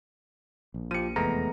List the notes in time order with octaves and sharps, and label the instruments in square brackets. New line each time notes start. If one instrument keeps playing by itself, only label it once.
[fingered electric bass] A#1
[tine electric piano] F3 G4 [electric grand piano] C#7 D#7
[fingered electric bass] F1 E2 [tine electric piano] G#3 A3 B3 [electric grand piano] A#5